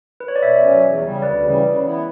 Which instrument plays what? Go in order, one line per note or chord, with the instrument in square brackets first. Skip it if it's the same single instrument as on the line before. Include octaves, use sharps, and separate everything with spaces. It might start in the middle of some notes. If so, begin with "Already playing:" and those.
[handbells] B4
C#5
D5
[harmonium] B2 [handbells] C#5 E5
[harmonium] F#3 C#4
E2
C#3 G3
[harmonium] D2 [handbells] B4 D5
[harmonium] C#3 E3 G3
C#3
E3 B3 E4